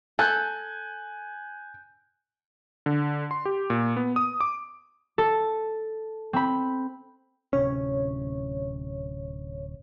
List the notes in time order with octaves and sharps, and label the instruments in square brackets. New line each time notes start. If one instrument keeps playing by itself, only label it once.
[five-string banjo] A4 [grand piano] G#5 F#6 G6
[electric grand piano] D3
C6
G4
A#2
B3
D#6
D6
[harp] A4
C4 B5
[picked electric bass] D1 C3 C#4 [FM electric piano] C#5